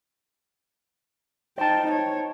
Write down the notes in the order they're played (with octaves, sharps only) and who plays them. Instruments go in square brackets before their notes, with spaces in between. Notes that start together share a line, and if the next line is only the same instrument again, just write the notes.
[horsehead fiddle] D#4 G5 [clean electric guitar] C5 A5
[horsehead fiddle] C#5